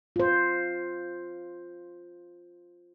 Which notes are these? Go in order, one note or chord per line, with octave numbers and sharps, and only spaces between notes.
F4 C5